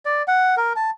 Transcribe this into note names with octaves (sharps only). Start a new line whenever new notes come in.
D5
F#5
A#4
A5